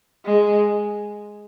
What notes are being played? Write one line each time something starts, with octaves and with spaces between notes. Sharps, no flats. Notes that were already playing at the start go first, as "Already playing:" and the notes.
G#3